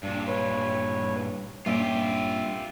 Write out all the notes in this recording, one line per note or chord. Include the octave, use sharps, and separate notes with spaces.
G2 A#2 D4
B4 C#5
G2 A#2 C#4 F4 G4 E5